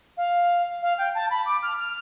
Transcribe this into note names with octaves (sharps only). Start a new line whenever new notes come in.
F5
F5
G5
A5
B5
D6
F6
F6